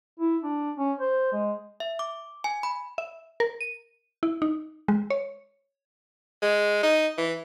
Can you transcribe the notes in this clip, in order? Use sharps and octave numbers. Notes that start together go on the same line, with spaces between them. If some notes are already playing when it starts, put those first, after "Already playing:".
E4
D4
C#4
C5
G#3
E5
D6
G#5
B5
E5
A#4
D#7
E4
D#4
G#3
C#5
G#3
D#4
E3